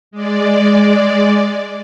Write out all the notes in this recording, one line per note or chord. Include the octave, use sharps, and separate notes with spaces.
G#3 D5